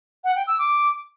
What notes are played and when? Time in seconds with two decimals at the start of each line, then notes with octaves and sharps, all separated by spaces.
0.24 F#5
0.36 G5
0.47 E6
0.59 D6